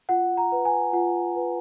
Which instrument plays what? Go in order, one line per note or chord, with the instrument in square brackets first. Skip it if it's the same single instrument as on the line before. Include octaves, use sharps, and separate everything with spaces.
[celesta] F4 F#5
A#5
B4
G#5
F4 F#5
B4